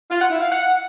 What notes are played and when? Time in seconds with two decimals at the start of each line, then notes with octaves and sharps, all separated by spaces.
0.10 F4
0.20 F#5
0.30 E4
0.40 F5
0.50 F#5